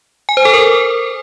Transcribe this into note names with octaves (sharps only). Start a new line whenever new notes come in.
G#5
C5
A4
A#4